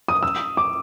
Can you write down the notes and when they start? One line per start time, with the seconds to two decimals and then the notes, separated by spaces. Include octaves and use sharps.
0.08 D#6
0.23 E6
0.57 D6